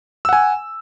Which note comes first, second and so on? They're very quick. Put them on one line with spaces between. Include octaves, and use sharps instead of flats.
E6 F#5 G#5